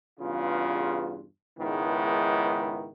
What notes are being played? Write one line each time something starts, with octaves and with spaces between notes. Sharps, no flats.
E2 G2 C#3 F4
C#2 G#2 D#3 B3 E4